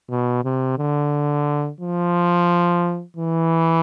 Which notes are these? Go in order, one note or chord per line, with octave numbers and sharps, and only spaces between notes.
B2
C3
D3
F3
E3